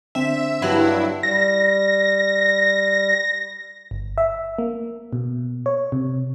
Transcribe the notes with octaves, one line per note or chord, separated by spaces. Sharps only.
D3 C4 E5
G2 F#3 E4
G3 A#6
G1
E5
A#3
B2
C#5
C3